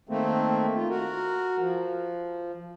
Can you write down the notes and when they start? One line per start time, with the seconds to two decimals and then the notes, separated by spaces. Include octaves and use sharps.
0.09 D#3 A3 A#3 C4
0.75 F4
0.90 F#4 A#4
1.59 F3